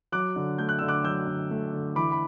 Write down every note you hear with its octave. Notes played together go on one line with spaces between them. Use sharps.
F#3 D6 F#6
D3
A3 G6
F#6
D3 E6
D6 F#6
F#3 E6 G6
D3
A3
D3
E3 B5 D6
B5